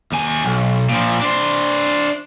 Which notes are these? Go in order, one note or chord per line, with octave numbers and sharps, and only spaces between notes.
D#2 G#5
B1
A#2 F3
D4 C5